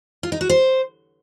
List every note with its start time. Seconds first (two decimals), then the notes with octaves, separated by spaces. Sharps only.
0.23 F4
0.32 D#4
0.41 F#4
0.49 C5